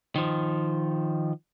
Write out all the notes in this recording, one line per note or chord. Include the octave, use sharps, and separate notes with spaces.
D#3 F3